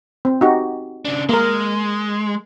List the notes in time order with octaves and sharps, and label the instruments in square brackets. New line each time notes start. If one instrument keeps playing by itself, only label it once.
[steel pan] C4
D#4 F#4 G4
[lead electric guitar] C#3 D4
[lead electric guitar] G#3 [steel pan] A#3 A#4